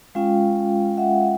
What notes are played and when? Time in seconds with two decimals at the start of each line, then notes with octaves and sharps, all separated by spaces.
0.15 G#3 C#4 F4 F5 G5
0.97 E5 F#5